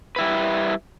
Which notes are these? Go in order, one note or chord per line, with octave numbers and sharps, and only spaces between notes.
G3 E4 B4